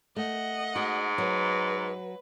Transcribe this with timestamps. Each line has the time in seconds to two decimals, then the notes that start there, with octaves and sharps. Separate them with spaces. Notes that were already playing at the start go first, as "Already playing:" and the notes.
0.16 A3 D#5 F#5
0.76 G#2 F#4
1.18 F#3 B4